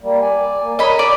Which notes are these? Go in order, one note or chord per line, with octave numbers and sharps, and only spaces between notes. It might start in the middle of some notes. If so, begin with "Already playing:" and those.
G3 A#3
D5 G#5
A#3
A#4 C#5 D#5 B5
D5